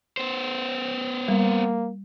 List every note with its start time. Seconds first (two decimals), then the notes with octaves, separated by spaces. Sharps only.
0.17 B3 C5
1.28 G3 A#3